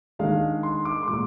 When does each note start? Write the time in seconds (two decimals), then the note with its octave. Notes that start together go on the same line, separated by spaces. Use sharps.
0.19 D#3 G#3 D4 F5
0.63 C6
0.85 D6
1.03 C6
1.08 A#2 G#3 D6